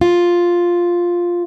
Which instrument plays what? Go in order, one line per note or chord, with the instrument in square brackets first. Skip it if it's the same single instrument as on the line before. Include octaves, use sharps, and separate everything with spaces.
[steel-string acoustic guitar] F4